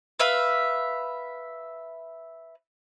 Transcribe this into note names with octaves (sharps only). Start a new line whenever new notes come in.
B4 E5 F5